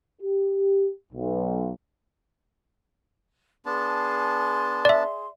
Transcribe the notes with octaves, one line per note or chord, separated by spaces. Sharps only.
G4
B1
B3 D4 G#4 A5 C6
D5 E5